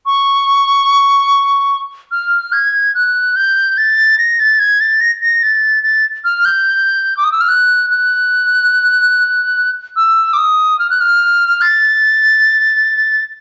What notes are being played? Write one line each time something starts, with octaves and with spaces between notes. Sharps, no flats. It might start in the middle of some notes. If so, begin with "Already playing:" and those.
C#6
F6
G#6
F#6
G6
A6
A#6
A6
G#6
A6
A#6
A#6
A6
A6
F6
G6
D6
D#6
E6
F6
F#6
F#6
E6
D6
D#6
F6
F#6
F6
A6